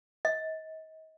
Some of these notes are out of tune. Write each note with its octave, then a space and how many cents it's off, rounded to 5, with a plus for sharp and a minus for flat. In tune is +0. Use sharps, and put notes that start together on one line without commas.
D#5 +35